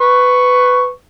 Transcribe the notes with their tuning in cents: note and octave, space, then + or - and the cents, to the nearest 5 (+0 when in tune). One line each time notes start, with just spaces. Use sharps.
B4 +15 C#6 +0